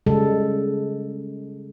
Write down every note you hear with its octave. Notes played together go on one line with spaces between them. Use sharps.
C#3 G3 G#3 A4